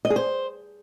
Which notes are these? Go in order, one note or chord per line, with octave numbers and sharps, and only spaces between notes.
D#5
G#4
C5